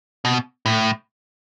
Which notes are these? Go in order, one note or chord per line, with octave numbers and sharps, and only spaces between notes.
B2
A2